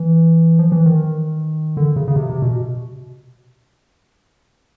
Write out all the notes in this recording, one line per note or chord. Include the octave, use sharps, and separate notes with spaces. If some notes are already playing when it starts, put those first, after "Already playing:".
Already playing: E3
F3
E3
D#3
D3
C#3
C#3
C3
C3
B2